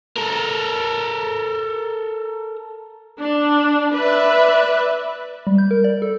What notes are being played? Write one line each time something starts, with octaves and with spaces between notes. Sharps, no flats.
A4 A#4
D4
B4 D5 E5
G3
G6
A#4
D5
A4